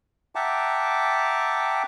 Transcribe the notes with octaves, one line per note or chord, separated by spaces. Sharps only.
E5 F#5 G5 A5 A#5 D6